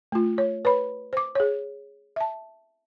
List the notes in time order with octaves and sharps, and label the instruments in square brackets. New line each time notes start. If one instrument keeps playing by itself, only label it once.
[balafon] A3 F4
C#5
B4 C#5 B5
C5 D6
G#4 C#5
E5 A5